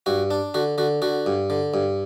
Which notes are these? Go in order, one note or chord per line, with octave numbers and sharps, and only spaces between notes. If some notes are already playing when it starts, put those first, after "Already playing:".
G2 F#4
D4
D3 F#4
D3 F#4
D3 F#4
G2
D3
G2